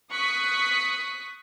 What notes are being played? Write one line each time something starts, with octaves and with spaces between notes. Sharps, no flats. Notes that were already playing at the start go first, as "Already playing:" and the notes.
C#6 D#6 F#6 B6